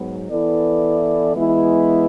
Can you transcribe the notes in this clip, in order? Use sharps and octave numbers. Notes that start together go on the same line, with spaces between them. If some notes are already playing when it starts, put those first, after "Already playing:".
Already playing: G#2 F#3 B3
E3 B3 E4 A4 D5
E3 G#3 B3 E4